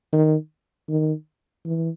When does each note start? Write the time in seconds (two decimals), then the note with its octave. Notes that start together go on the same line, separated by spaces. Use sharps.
0.13 D#3
0.89 D#3
1.66 E3